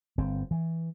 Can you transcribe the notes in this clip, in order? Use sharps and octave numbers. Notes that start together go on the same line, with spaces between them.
G1 C4
E3